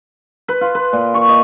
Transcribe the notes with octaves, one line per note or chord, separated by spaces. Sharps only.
B4
F4
B4
A#2
C#6
D#5